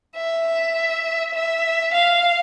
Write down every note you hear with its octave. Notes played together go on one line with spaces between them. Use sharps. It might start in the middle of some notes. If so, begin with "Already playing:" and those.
E5
E5
F5